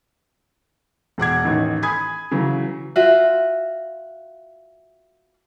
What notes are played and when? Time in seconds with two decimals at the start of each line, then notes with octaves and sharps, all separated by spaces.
1.18 E1 F#5 D6 G#6
1.45 A1 D#3
1.82 G#5 B5 D#6 G#6
2.31 C#3 E3 F#3
2.96 F4 F#4 E5